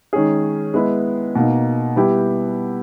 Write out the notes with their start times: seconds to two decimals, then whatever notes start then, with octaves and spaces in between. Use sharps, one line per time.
0.13 D#3 G#3 C#4 G#4
0.74 G#3 B3 E4
1.35 B2 A#3 D#4
1.96 G3 B3 E4 G4